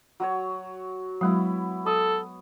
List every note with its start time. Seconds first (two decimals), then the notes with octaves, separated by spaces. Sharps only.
0.20 F#3 F#4 C#5
1.21 F#3 G#3 B3 E4
1.86 A4 D#6